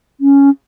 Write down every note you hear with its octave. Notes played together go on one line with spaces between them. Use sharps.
C#4